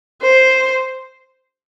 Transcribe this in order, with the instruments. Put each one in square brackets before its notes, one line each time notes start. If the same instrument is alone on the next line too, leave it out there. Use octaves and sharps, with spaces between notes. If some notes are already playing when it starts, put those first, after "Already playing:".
[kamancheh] C5